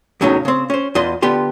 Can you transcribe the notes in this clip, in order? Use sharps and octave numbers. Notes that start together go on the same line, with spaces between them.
E2 A2 C#3 F#3 C#4 D#4
C#3 C4
C#4 C5
E2 F4 D#5 C6
D3 B3 F4 G4 C6